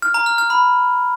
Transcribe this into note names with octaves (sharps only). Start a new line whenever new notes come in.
F6
A#5
F6
F6
B5